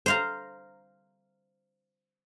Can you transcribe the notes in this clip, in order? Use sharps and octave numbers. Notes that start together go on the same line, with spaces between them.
C5 F5 A#5